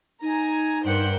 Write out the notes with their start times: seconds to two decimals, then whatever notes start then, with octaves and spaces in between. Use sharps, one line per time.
0.22 D#4 G#5 A#5
0.85 G2 A#4 C5 F#5 G5